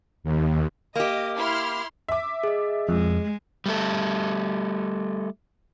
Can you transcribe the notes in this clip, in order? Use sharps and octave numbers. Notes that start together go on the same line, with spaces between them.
D#2
A#3 G4 D#5
E4 C6 F6
E5 D6
G#4 D#5
F2 G#3
G3 A3 A4